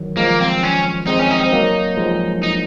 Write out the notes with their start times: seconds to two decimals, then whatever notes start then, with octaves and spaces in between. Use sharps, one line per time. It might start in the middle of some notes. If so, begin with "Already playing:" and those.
Already playing: D#3 F#3
0.17 F3 G#3 A#3
0.40 C4
0.63 C#4
1.07 G#3 C4 D#4
1.19 C#4
1.30 D#4
1.41 C4
1.52 F#3 A#3
1.97 F3 G#3
2.43 D#4